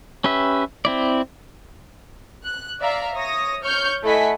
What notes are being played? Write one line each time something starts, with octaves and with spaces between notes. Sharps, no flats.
C#4 G4 B4 E5
C4 E4 D5
F#6
D5 E5 F5 A#5
C#5 D#6 A#6
C#5 C#6 F6 G6
A3 E4 D#5 F#5 G#5 B6